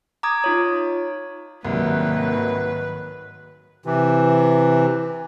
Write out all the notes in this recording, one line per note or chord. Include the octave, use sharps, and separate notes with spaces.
A#5 D6 D#6 G#6
D#4 F4 C#5
C2 G#2 D#3 F#3 A#3 B4
C3 E3